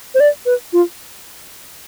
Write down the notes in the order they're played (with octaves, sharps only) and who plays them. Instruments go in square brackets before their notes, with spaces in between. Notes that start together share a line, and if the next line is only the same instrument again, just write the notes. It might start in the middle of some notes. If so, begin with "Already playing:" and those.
[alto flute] C5
D5
B4
F4